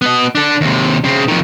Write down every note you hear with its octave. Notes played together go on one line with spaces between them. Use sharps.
B3 D#5
D4 A4
D#2 C3
C#3 C4
F2 D#3